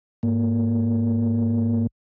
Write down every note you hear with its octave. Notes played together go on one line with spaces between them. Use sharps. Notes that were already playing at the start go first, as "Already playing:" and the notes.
G#2 A#3